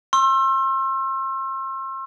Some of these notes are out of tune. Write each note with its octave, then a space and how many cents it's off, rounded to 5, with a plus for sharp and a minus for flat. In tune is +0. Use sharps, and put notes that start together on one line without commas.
C6 +35 E6 +25